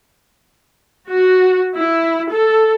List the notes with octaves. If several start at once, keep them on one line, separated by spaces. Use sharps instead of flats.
F#4
E4
A4